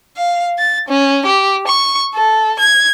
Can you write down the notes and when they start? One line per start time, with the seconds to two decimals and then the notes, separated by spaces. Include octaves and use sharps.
0.17 F5
0.58 A6
0.88 C#4
1.26 G4
1.67 C#6
2.14 A4
2.59 G#6